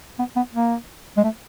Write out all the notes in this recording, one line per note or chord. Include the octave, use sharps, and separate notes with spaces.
B3
B3
A#3
G#3
A3